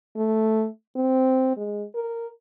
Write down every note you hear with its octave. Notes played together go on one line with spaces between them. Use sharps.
A3
C4
G#3
A#4